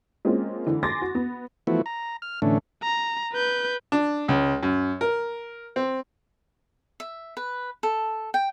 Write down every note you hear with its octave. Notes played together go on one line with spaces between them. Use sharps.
G#3 A#3 C4 C#4 F4
D3 E3
G#5 C6 D6 A6 A#6
F#4
B3
E3 F3 A3 B3 E4 F#4
A#5
F6
A2 D3 E3 A3 C#4 D4
A#5
B4 G6
D4
C#2
F#2
A#4
C4
E5
B4
A4
G5